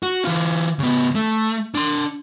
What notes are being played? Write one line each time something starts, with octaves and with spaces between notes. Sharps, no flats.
F#4
E3 F4
C#3 B3
A3
D4 C6